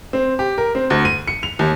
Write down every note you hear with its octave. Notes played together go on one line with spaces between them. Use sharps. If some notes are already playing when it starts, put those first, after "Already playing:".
C4
G4
A#4
C4
D2
D#7
C#7
F7
D#2